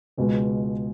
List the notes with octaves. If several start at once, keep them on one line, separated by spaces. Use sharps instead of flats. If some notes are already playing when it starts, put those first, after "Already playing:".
C#2 B2 G#3